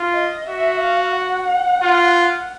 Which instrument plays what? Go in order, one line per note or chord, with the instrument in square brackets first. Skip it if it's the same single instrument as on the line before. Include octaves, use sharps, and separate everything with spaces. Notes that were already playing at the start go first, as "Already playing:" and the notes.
Already playing: [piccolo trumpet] F4
[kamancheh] D#5
[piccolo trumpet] F#4 [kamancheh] E5
[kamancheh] F5
F#5
[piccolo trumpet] F4